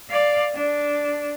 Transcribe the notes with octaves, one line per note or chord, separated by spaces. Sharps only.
D5 F5
D4